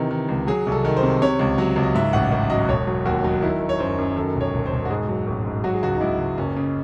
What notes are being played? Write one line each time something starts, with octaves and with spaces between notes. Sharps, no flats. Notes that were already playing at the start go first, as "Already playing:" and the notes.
Already playing: C3 D#3 E3
D#3
C#2
F#3 G#4
C2
A4
D#3
C5
C3
C3 C#5
C#2
F#3
C#2
D#5
G#2 E5
A1 F#5
A1 E5
F#3 D#5
E1 C#5
F#3
D#2 F#4
F#3
D#3 E4
D#3
C#5
F#2 C5
F#2
D#3 A4
E1
C#5
E1
C5
E1
F#4
G#2 G#4
F#3
A1
G#2
F#3 F#4
G#4
C#2 F#4
D#4
C#2 E4
C#2
F#1 C#4
C#3